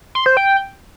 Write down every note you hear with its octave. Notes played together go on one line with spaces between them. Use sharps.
C6
C5
G5